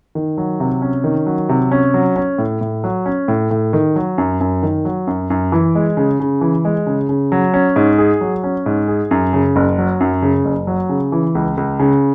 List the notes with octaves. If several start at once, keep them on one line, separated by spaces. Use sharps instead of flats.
D#3
F#3
C3
C#4
D#3
F#3
C3
C#4
F#3
C#4
A2
A2
F#3
C#4
A2
A2
D#3
F#3
F#2
F#2
D#3
F#3
F#2
F#2
E3
G#3
C#3
C#3
E3
G#3
C#3
C#3
F#3
C#4
G#2
G#4
F#3
C#4
G#2
G#4
F#2
C#3
F#1
F#3
F#2
C#3
F#1
F#3
C#3
E3
C#2
C#2
C#3